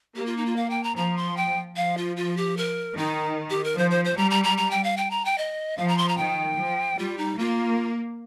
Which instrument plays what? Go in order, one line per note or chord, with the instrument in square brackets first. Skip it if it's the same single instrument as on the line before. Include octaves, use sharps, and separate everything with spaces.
[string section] A#3 [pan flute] G4
[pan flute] F4
D#4
F4
F5
G5
A#5
[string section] F3 [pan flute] A#5
[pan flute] C6
G5
[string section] F3 [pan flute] F5
[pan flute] F4
F4
G4
A#4
[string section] D#3 [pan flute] D#4
[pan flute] G4
A#4
[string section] F3 [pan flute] C5
[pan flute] C5
C5
[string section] G3 [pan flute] A#5
[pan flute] A#5
A#5
A#5
G5
F5
G5
A#5
G5
D#5
[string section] F3 [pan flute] F5
[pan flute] A#5
C6
A#5
[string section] D#3 [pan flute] G5
[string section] F3
[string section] G3 [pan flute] F4
[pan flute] D#4
[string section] A#3 [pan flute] F4